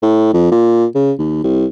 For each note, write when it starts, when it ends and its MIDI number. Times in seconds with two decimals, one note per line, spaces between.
0.03 0.34 45
0.34 0.49 41
0.52 0.86 46
0.95 1.12 49
1.19 1.39 39
1.44 1.66 36